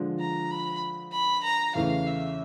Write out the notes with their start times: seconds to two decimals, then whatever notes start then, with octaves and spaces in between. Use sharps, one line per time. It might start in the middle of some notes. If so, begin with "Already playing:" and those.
Already playing: D3 F3 G#3
0.20 A#5
0.51 B5
1.13 B5
1.44 A#5
1.75 E2 C#3 E3 A3 C#4 F5
2.07 E5